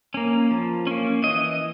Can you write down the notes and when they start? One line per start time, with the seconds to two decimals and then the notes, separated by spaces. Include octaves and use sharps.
0.14 A#3 C#4
0.51 F3
0.87 A#3 C#4
1.23 E3 D#5